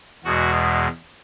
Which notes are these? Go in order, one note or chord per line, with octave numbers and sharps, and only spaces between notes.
E2 B2 G#3 F#4